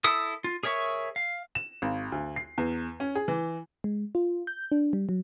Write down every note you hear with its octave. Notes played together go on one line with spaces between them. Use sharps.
E4 A4 D#6
F4
G#4 A#4 C#5 E5 C#6
F5
E7
G#1
D2
C7
E2
C#4
G#4
E3
G#3
F4
G6
D4
G3
F#3